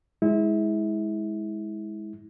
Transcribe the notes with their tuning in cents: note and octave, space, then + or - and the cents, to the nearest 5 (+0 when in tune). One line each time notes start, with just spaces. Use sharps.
G#3 +0 E4 -30